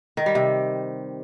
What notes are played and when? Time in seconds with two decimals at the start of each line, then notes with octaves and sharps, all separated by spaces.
0.17 D#3
0.26 G3
0.35 C3